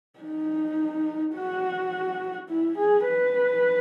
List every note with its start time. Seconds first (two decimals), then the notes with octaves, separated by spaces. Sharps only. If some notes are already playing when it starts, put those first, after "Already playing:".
0.20 D#4
1.35 F#4
2.49 E4
2.78 G#4
3.08 B4